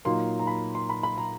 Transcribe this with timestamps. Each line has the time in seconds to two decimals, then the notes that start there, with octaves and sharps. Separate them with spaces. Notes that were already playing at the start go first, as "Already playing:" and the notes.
0.05 A#2 F#3 A#3 D#4 C6
0.40 A#5
0.47 B5
0.75 C6
0.90 B5
1.03 B5
1.18 A#5